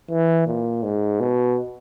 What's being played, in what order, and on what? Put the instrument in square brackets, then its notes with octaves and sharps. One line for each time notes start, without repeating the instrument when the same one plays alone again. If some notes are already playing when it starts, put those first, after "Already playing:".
[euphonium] E3
A#2
G#2
B2